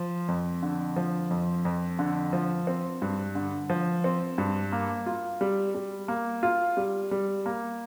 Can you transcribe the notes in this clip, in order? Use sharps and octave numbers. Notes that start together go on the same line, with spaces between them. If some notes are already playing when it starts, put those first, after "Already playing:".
Already playing: F3
F2
D3
F3
F2
F2
D3
F3
C4
G2
D3
F3
C4
G2
A#3
F4
G3
G3
A#3
F4
G3
G3
A#3